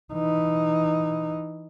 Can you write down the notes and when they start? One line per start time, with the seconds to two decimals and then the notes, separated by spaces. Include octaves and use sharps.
0.13 E3 D#4